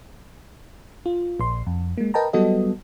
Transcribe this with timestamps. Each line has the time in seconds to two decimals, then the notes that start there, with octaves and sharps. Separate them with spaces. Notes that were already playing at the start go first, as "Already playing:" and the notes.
1.06 F4
1.40 A#1 C6
1.67 F2
1.98 G#3 A#3
2.14 A#4 B4 D#5 G5 A5 A#5
2.33 F#3 G3 B3 F#4 A4 D#5